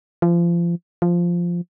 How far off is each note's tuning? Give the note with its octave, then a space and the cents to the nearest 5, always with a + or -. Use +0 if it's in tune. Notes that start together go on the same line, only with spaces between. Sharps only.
F3 -30
F3 -5